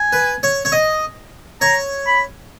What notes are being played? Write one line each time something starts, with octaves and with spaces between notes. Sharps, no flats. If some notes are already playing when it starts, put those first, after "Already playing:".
Already playing: G#5
B4
C#5
C#5
D#5
C#5 A#5
B5